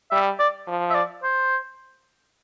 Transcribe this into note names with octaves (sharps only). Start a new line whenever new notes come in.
G3 E5
D5
F3
E5
D5
C5